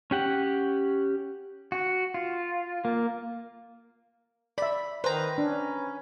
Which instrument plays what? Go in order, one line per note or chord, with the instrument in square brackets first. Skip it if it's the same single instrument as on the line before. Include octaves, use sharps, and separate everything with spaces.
[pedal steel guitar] C#4 G4 F#5
F#4
F4
A#3
[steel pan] D5 E5 [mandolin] B5
[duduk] D#3 [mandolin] B4 A#5 [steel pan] C5
[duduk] C#4 [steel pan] D4